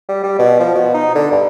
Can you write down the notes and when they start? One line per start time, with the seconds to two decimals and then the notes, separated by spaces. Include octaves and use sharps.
0.09 G3
0.23 G3
0.39 B2
0.60 F3
0.75 B2
0.94 D#4
1.15 D3
1.32 G2